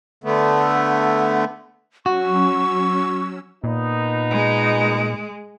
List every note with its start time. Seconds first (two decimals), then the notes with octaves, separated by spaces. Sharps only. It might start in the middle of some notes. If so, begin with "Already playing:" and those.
0.24 D3 A3 B3
2.06 F#3 C#4 F#4 C#6 E6
3.64 A#2 B3 D#4
4.30 G#3